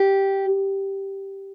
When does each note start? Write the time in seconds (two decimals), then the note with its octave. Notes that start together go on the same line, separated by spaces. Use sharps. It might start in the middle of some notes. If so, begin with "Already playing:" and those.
Already playing: G4